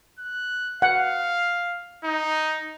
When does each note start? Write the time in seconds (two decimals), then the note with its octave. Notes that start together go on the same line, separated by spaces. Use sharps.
0.19 F#6
0.82 F5 F#5
2.05 D#4